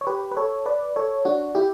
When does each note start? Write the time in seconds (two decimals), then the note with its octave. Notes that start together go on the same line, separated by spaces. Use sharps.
0.01 C#5
0.07 G4 B4
0.31 B4
0.37 A4 C#5
0.66 B4 D5
0.96 A4 C#5
1.25 D4 F#4
1.55 E4 G4